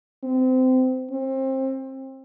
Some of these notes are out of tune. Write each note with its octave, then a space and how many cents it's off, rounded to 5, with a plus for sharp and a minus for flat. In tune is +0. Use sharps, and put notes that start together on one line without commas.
C4 -25
C4 +25